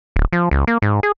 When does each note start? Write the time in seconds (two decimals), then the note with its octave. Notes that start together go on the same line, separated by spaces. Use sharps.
0.16 D1
0.33 F3
0.51 C#2
0.67 A#3
0.82 G#2
1.03 G#4